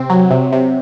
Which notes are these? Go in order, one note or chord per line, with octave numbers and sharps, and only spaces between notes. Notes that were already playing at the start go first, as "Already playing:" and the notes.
Already playing: C3 C4
F#3
C3
C3